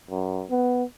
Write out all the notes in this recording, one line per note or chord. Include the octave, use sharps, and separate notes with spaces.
F#2
B3